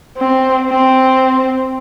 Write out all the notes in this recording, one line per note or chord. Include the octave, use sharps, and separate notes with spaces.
C4
C4